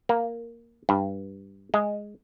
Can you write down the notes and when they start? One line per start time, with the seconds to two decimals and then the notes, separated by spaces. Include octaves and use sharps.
0.09 A#3
0.89 G2
1.74 G#3